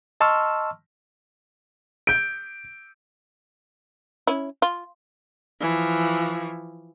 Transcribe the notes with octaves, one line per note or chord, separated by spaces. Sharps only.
D#5 A5 C6 C#6 E6 F6
G6 D7
C#4 E4
F4
E3 F3